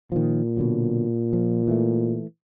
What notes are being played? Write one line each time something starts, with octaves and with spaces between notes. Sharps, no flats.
A#2 D#3 F3
B2 D3 F#3
F3
E3 A3